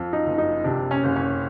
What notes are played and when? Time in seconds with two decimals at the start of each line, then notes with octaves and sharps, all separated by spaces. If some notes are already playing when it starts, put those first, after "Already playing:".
Already playing: F2
0.13 D#4
0.26 F#1
0.38 D#4
0.64 C3 D4
0.91 C#4
1.04 F#1
1.16 C#4